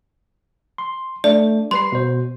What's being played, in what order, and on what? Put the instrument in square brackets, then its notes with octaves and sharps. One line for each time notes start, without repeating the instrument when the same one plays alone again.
[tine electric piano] C6
[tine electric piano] A3 D4 [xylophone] D5
[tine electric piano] G3 B4 C7 [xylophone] C6
[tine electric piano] B2 C5